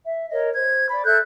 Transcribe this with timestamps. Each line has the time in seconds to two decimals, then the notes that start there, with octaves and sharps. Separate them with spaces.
0.05 E5
0.31 A#4 C#5 D#5
0.55 C5 G#6
0.90 D5 B5
1.05 A4 E5 F#6 G6